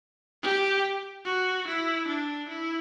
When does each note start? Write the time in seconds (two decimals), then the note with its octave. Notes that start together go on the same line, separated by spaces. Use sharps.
0.43 G4
1.25 F#4
1.67 E4
2.08 D4
2.49 E4